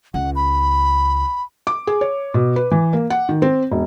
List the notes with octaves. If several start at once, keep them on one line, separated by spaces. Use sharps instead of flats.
C#2 F#5
B5
D6
G#4
C#5
B2
B4
E3
A#3
F#5
D#3
C4
E1